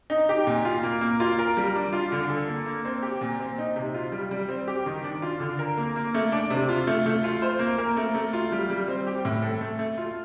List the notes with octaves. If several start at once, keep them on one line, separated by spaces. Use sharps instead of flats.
D#4
G4
A#2
F4
A#3
A#3
F4
A#4
G3
D4
F4
D3
A4
A#3
A#3
C4
G4
A#2
C4
D#4
C3
F4
G3
G3
C4
G4
D#3
D4
F4
D3
A#4
A#3
A#3
A3
D4
C3
F4
A3
A3
F4
C5
A#3
A#4
A3
A3
F4
G3
G3
C4
G4
A2
A4
A3
A3
F4